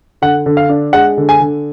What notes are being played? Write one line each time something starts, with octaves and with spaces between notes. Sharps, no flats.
D3 F#5
D3
F5
D4
G#3 F#5
D3
G#5
D3